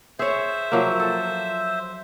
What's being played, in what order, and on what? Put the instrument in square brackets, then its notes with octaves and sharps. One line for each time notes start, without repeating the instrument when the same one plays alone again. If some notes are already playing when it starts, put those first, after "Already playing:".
[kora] G#4 C#5 [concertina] C5 E5
[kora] F3 F#3 A#3
A4